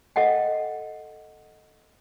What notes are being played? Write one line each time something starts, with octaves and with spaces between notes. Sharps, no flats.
A4 D#5 F#5 G5